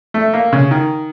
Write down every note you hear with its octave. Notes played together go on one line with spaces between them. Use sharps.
A3
A#3
C#3
D#3